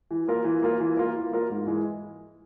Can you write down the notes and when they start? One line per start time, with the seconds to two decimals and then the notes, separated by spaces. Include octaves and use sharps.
0.11 E3
0.28 A#3 F4 A#4
0.44 E3
0.62 A#3 F4 A#4
0.80 E3
0.97 A#3 F4 A#4
1.14 E3
1.31 A#3 F4 A#4
1.50 G#2
1.67 E3 G#3